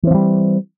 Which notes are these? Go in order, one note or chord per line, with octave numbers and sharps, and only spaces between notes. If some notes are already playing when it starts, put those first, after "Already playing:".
E3 F3 G3 C4